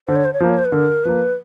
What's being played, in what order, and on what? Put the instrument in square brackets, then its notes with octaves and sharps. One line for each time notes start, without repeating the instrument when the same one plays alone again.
[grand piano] D3 [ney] C5
[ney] C#5
C5
C#5
[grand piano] F3 A#3 [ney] C5
[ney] C#5
C5
B4
[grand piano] D3 [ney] A#4
[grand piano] F3 A#3 [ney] B4